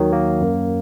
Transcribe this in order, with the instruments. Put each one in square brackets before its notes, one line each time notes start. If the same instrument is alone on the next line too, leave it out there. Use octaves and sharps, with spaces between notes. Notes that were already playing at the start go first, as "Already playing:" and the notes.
Already playing: [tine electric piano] D#2 D#3 F#3
A#3
F#2